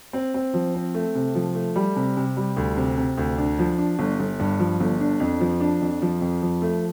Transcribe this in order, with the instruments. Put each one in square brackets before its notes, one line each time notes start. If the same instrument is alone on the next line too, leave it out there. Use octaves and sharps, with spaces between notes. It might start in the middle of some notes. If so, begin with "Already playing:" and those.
[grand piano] C4
C4
F3
C4
A3
C3
F3
A3
G3
C3
C3
G3
D2
C3
C3
D2
D4
F3
D4
G1
G1
G2
F3
G1
D4
F2
F3
D4
F2
F3
F2
F3
A3